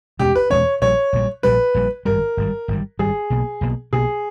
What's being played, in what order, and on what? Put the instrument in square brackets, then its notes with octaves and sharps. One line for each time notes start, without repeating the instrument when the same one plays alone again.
[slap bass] E2 B2 G#3 C#4 [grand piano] G4
[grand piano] B4
[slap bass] E2 B2 G#3 C#4 [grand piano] C#5
[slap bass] A#1 A#2 G3 [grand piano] C#5
[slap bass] A#1 A#2 G3
[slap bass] A#1 A#2 G3 [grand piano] B4
[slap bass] A#1 A#2 G3
[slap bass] G#1 G2 G3 [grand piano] A#4
[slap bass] G#1 G2 G3
G#1 G2 G3
[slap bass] G#1 G2 G3 [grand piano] G#4
[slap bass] B1 B2 A#3
B1 B2 A#3
[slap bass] B1 B2 A#3 [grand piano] G#4